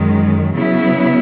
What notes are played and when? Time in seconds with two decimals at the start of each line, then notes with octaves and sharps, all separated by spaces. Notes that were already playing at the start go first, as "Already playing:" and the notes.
Already playing: F#2 D#3 G#3
0.54 C#3 F#3 B3 E4